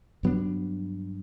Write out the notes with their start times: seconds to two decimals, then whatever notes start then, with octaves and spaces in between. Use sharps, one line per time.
0.23 G2 F#3 B3 D4